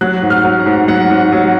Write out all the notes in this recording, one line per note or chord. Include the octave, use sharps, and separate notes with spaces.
F#3 F#6
G#2
F6
F#3
F#5
G#2
F#3 F#5
G#2
F#3